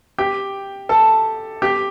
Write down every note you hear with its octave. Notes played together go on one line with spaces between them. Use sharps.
G4 G5
A4 A5
G4 G5